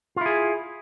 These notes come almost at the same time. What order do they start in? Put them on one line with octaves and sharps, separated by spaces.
F4 E4 G#4